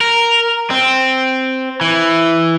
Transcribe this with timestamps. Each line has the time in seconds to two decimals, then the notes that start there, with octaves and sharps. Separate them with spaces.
0.01 A#4
0.70 C4
1.81 E3